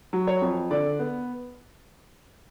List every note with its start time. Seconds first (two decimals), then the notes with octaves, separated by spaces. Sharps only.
0.13 F#3
0.27 C#5
0.42 F2
0.71 D3 D5
0.99 B3